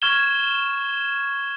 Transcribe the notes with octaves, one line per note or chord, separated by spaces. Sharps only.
C#6 F6 G#6 E7 G7